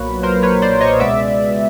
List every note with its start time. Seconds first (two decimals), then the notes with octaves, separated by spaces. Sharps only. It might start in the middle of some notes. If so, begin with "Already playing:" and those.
Already playing: B1 A#2 F#3 A#3 B4 C#5
0.23 A#4 C5
0.43 B4 C#5
0.62 C5 D5
0.80 C#5 D#5
1.00 C#2 B2 G#3 B3 D5 E5